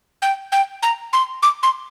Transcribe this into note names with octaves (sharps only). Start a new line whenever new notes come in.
G5
G5
A#5
C6
D6
C6